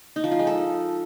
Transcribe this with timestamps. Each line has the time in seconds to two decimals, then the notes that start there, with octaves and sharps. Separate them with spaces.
0.16 D#4
0.24 F3
0.31 F4
0.39 G#3
0.47 A4